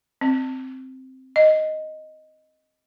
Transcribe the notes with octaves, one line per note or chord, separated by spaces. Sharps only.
C4
D#5